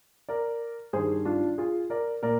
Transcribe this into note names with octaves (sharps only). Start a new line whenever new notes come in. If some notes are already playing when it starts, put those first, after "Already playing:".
A#4 D5
G2 D#3 G3 G#4 C5
D4 F4
F4 G#4
A#4 D5
A#2 A#4 D5